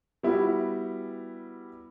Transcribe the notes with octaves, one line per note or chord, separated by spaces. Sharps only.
G3 B3 E4 F#4